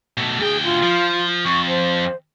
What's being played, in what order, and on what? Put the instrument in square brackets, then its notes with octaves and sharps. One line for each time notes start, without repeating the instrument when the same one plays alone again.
[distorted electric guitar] B2 A3
[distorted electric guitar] D2 G5 [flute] G#4
[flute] F4
[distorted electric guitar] F3
[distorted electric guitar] F2 [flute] C#6
[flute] C5